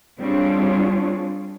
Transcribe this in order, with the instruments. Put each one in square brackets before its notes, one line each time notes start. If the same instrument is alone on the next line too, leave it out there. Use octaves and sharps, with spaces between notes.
[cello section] G3 C4 D4 F4 G#4 C#5